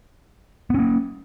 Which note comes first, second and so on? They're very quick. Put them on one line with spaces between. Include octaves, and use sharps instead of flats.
B3 C#4 A#3